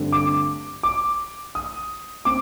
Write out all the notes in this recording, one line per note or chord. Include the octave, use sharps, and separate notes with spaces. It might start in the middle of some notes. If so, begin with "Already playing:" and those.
Already playing: G2 D3 A3 C4
D6
D6
D#6
C4 D6